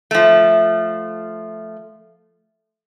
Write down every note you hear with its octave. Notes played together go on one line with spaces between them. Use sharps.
F3 A3